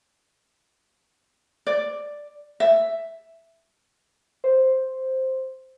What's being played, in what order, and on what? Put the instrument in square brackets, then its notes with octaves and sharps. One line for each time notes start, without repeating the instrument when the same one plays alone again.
[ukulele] D5
E5
[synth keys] C5